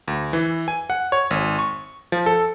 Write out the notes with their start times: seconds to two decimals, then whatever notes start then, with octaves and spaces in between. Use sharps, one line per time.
0.08 D2
0.33 E3
0.68 G#5
0.90 F#5
1.12 C#5
1.31 G#1
1.59 C#6
2.12 F3
2.26 A4